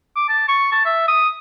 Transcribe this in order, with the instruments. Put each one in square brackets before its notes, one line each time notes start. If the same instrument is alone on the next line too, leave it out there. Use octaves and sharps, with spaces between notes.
[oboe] D6
A5
C#6
A5
E5
D#6